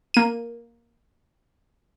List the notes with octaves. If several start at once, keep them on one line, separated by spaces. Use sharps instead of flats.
A#3 D#7